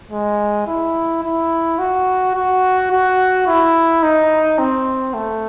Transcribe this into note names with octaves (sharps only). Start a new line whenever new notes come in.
G#3
E4
E4
F#4
F#4
F#4
E4
D#4
C4
A3